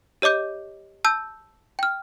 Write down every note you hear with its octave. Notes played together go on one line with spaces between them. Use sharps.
G4 C#5 D#5 D6 G6
A5 E6 G6
G5 F6